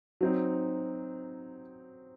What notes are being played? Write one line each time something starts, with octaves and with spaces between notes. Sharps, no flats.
F#3 C4 D#4